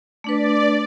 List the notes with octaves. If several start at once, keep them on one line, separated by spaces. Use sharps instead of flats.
A3 D4 B4 D5